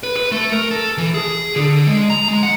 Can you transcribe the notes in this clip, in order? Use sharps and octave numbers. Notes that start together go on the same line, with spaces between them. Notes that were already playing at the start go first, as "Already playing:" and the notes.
B4
B4
A3
A#4
A4
E3
G#4
D3
G#3
A#5
G#3
F#5